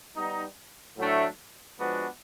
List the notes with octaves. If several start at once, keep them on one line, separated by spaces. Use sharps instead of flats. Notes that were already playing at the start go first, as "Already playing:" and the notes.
G3 B3 D#4
A2 F#3 A3 D4
F3 G#3 B3 D4 F#4